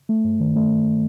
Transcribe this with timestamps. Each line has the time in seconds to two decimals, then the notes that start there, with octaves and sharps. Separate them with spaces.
0.09 A3
0.24 G2
0.40 D#3
0.56 A3